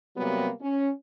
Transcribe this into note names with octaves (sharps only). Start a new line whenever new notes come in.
C3 F#3 G3 A#3 B3
C#4